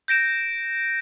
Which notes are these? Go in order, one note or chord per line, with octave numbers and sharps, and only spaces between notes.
G6 A#6 D7 E7